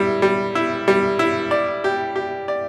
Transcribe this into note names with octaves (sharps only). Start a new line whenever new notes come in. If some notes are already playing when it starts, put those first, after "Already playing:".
Already playing: G3 E4
G3
E4
G3
E4
D5
G4
G4
D5